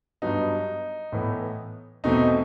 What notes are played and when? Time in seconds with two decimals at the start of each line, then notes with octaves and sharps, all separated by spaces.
0.22 G2 F#3 B3 D#4
1.12 A2 E3 B3
2.04 E2 B2 A3 C4 D#4